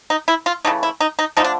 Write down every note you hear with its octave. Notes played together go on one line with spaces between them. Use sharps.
D#4
E4
F4
C#3 E3 A3 D#4
E4
D#4
D#4
D3 F3 A3 D#4
D4